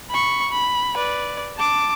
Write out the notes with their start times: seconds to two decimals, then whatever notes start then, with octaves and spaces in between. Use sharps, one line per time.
0.11 B5 C#6
0.51 B5
0.97 B4 D5
1.57 A5 D6